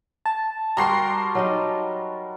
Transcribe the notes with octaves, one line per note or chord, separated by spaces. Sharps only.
A5
G3 F#4 A#4 A#5 C6 C7
F#3 D#4 D#5